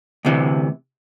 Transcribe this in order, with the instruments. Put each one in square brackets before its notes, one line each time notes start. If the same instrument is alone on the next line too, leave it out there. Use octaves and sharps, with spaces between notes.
[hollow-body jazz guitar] D2 C3 E3